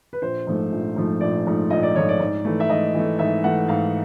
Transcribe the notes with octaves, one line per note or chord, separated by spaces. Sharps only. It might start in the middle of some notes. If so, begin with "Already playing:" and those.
B4
A#1 C5
G#2 F3 A3
A#1
G#2 F3 A3
A#1 D5
G#2 F3 A3
A#1 D#5
D5
G#2 F3 A3 C#5
D5
G#2
E3 A3
E5
G#2 D#5
E3 A3
G#2 E5
E3 A3 F#5
G#2 F5